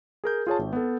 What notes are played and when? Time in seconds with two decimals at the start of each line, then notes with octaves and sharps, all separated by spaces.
0.24 G#4 A#4 G6
0.47 F4 G#4 C#5 A5
0.59 G#1
0.73 B3 A4